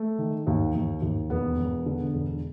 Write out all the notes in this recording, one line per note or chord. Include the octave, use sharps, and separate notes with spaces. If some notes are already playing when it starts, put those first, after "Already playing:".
Already playing: A3
D#3
D#2
D#2
D#2
E1 B3
E1
D3
E1